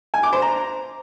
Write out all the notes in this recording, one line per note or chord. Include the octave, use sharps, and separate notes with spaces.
G#5
D6
C5
A#5